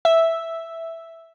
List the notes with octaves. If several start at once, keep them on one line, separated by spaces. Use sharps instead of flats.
E5